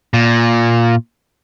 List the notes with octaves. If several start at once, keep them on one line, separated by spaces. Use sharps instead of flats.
A#2